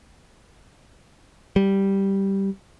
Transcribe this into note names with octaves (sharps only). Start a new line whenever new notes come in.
G3